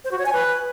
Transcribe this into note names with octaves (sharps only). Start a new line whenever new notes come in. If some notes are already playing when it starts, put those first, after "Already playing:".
C5
F#4
C#5
G#5
B4